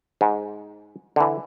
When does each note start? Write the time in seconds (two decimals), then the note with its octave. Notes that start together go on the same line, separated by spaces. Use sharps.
0.21 G#2
1.16 D3 E3